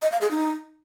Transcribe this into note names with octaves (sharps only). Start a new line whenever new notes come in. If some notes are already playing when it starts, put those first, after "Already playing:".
D#5
F5
G#4
D#4